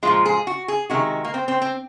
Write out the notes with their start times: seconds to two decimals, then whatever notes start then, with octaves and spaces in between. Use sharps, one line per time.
0.03 A#2 F3 G#3 F4
0.26 G#4
0.47 F#4
0.68 G#4
0.90 C3 D#3 G#3 F#4
1.24 A#3
1.34 C4
1.48 C4
1.62 C4